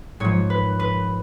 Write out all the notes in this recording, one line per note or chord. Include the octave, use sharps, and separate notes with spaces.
G#2 F3 C#5
B4
B4